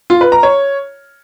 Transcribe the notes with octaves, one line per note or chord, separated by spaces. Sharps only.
F4
B4
A#5
C#5